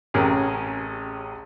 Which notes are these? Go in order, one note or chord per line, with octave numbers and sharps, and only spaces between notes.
A1 C3 C#4 G#4 A#4 G#5